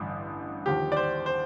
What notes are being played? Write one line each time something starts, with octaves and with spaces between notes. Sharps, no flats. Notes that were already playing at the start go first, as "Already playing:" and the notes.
Already playing: A1 G2 D3
D#2 D3 F3 G4
D5
C5
C5